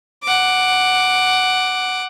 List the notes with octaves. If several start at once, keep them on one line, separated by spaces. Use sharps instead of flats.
F#5 D6